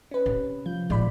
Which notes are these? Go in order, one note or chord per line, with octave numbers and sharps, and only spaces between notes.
C#4 B4
C3
F3 G6
A#2 G#3 D5 B5